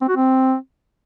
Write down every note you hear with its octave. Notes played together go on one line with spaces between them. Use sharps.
C4
F#4
C4